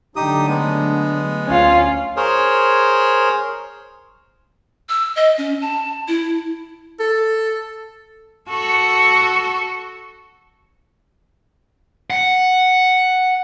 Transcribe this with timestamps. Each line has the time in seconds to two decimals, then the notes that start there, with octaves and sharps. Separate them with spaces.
0.16 D3 F#3 A3 D#4 G4 D#6
0.48 G#3 B3
1.47 D2 C#4 F4
2.17 G#4 A#4 C5 C#5
4.89 E6
5.16 D#5
5.38 C#4
5.62 A5
6.08 E4
6.99 A4
8.49 F#4 A4
12.10 F#5